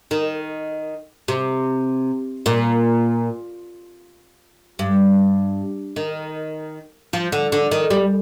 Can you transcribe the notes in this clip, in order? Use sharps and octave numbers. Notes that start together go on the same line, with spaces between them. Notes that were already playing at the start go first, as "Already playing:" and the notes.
D#3
C3
A#2
G2
D#3
F3
D3
D3
D#3
G3